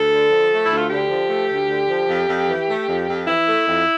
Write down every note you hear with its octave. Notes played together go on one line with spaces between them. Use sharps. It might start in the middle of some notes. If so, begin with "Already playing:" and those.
Already playing: D2 A4
D3
F3
A3
D2 E4
F4
D3 G4
F3
A3
D2
D3
F3
F2
F2
E3
A3
F2
F2
E3 E4
A3
F2